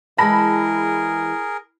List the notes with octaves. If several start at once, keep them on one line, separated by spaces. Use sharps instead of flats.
E3 G#3 G#4 A#4 A5 B5 A#6